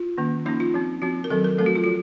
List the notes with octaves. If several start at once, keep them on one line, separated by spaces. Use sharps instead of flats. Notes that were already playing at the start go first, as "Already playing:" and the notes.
Already playing: F4
D#3 A#3 C#4
F3 A#3 C#4 D#4
F4
F3 C4
F3 C4 F#4
A#4
D#3 F#3 C4 A4
A#4
F3 A3 C4 A4
F#4
F4
F3 F#4